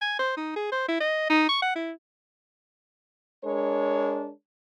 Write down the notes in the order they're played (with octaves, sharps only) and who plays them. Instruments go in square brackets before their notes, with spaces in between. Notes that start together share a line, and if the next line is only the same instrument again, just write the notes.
[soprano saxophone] G#5
C5
D#4
G#4
C5
E4
D#5
D#4
C#6
F#5
E4
[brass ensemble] G#3 D4 A#4 C#5